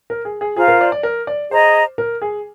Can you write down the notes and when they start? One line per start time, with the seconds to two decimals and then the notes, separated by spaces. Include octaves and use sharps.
0.10 A#4
0.25 G#4
0.41 G#4
0.56 F4 G#4 C5 F5 A#5
0.68 A#4
0.81 D5
0.92 D5
1.03 A#4
1.27 D5
1.51 G#4 C5 D#5 A#5
1.98 A#4
2.22 G#4